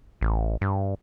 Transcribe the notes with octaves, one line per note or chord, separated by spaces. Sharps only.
A1
G2